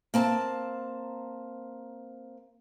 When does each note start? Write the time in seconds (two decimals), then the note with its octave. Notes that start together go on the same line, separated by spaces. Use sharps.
0.14 A#3 C4 A5